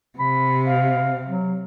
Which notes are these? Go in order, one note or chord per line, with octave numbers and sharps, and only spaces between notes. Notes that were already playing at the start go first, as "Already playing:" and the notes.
C3 B5
F5
F#3